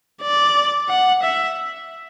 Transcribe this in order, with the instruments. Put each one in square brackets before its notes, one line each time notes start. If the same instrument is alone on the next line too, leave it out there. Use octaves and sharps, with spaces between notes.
[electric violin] D5
F#5
E5